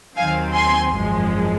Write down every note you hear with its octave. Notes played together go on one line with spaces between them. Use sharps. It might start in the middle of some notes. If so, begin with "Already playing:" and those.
D#2 D#3 F#3 C4 F5 G#5
G#5 C6
G#1 F#2 F3 G#3